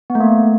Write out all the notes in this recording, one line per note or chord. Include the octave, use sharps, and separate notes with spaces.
B3
A3
A#3